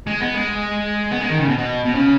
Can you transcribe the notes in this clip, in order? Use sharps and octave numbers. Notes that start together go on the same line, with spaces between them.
G#3
B3
G#3
B3
G#3
D#3
C#3
B2
B2
B2
C#3